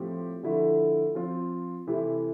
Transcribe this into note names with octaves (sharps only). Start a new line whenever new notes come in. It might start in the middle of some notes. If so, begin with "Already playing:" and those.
Already playing: A2 F3 C4 G4
D3 F3 A3 E4
F3 C4 F4
C3 E3 A3 E4